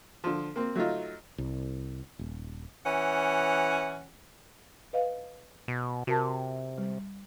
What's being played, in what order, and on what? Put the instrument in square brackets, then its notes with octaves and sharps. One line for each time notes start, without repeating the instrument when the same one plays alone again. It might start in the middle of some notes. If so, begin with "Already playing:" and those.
[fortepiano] D3 F3
A#3 C4
F#3 A3 D#4 F4
[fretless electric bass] C2
D#1
[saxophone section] E3 C#4 F#5
[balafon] B4 D#5 F5
[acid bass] B2
[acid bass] C3 [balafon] F#4 A#4 A5
[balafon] G3